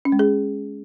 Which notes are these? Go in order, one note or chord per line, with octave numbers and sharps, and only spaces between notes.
C#4
G#3
G#4